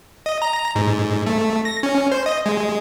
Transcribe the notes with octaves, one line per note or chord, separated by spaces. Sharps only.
D#5
A#5
G#2
A3
A#6
C#4
C5
D#5
G#3